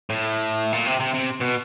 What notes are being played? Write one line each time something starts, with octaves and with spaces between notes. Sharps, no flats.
A2
A#2
C3
C3
C3
B2